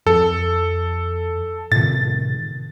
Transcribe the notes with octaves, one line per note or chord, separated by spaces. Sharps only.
F2 A4
A2 C3 D#3 A6